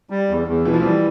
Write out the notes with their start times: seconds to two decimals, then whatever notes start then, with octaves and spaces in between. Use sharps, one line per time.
0.10 G3
0.29 E2
0.47 E2
0.66 B2 E3
0.73 F3
0.80 E3 G3